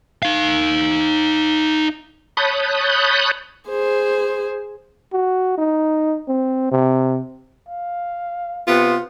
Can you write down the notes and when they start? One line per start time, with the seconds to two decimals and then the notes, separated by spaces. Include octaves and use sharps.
0.23 D#4 F5
2.37 C#5 A5 B5 D#6 F#6 G6
3.69 G#4 C5
5.13 F#4
5.58 D#4
6.28 C4
6.72 C3
7.68 F5
8.67 C3 B3 F4